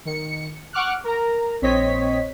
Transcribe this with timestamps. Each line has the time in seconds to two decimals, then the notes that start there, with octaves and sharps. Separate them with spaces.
0.05 D#3 C#7
0.73 F#5 C#6 D6 F6 F#6
1.04 A#4 A#5
1.62 A#1 C4 C#5 D#5 B6